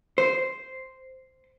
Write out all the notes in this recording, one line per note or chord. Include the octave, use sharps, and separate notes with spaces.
C5